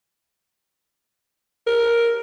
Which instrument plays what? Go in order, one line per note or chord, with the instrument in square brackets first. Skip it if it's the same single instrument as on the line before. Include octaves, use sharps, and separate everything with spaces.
[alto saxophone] A#4